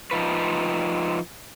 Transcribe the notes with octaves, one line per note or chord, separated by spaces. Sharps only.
F3 D#4 F4 B4